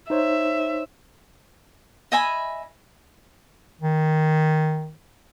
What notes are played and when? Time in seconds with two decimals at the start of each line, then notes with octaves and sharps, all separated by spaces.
0.10 D#4 C5 C#5 E5
2.12 D#5 E5 G#5 B5
3.81 D#3